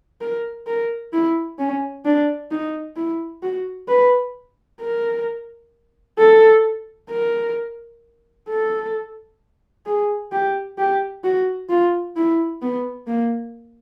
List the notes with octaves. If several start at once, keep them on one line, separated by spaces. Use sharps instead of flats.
A#4
A#4
E4
C#4
D4
D#4
E4
F#4
B4
A#4
A4
A#4
A4
G#4
G4
G4
F#4
F4
E4
B3
A#3